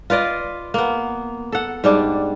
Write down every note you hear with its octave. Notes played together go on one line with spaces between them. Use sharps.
F4 B4 D5 D#5
A#3 B3
A4 F#5
G#2 G3 D4